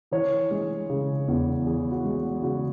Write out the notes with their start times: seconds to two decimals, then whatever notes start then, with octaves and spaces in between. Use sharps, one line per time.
0.11 E3 C#5
0.51 G#3
0.90 C#3
1.28 E2
1.66 E3 G#4
1.92 F#4
2.04 G#3
2.42 C#3 F#4